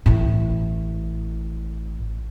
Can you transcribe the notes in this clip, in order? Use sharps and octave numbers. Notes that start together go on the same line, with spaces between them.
A1 A2